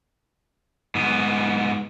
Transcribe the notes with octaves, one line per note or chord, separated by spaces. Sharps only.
G#2 B3